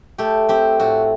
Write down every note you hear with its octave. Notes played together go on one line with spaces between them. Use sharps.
A3 G4
C4 G4
A2 F#4